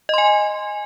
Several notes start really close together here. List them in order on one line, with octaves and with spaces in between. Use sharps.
D#5 C6 G#5